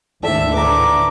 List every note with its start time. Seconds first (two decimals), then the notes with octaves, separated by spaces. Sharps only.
0.23 D2 G#2 D#3 A4 D5 E5 C6
0.53 A2 D3 B4 A#5 D6